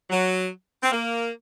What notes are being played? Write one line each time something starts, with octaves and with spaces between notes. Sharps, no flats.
F#3
C4
A#3